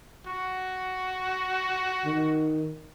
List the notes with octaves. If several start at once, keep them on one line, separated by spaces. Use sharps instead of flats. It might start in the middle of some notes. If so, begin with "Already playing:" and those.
F#4
D#3